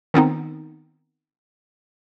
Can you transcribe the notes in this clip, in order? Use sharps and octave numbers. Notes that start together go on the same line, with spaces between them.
D#3 B3 C4 D#4